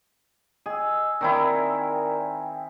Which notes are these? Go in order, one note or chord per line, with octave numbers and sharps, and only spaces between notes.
G#4 D#5 E6
D#3 C4 E4 A#4 D5 A#5